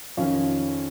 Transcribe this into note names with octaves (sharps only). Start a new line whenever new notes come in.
F2 D#3 C#4 F4